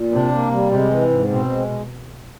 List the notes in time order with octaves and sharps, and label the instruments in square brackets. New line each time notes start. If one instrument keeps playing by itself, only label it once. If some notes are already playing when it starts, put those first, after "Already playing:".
Already playing: [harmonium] A#2
[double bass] C3 [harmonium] D4
[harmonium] A#3
G3
[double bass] C3 [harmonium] G#3
[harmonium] E3
G#2
[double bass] B2 [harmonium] C4
[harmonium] G#3